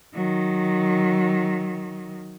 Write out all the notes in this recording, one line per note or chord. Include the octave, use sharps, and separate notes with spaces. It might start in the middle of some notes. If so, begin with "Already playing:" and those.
D#3 F#3